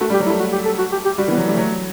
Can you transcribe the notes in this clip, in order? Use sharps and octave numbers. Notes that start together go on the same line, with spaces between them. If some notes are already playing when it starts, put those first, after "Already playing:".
A3 F#4
G3
G4
F#3
E4
A3
F#4
G4
A4
F#4
G4
G4
G3 F#4
E3
B3
F#3
G3 A3
F#3